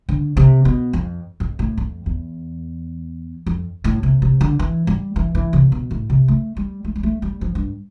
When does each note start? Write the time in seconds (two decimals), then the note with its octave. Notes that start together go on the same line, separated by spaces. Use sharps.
0.09 D3
0.37 C3
0.65 B2
0.93 F2
1.40 F2
1.59 A2
1.78 F2
2.06 E2
3.46 F2
3.84 A2
4.03 C3
4.22 C3
4.41 D3
4.59 E3
4.87 G3
5.16 E3
5.35 E3
5.53 C3
5.72 B2
5.91 A2
6.10 C3
6.28 A3
6.57 G3
6.85 A3
6.96 G3
7.03 A3
7.22 G3
7.41 F3
7.55 G2